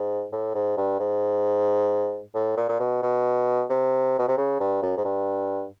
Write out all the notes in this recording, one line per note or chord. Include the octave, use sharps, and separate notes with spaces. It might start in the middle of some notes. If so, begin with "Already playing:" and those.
Already playing: G#2
A2
G#2
G2
G#2
A2
A#2
A#2
B2
B2
C3
B2
C3
C#3
G2
F#2
G#2
G2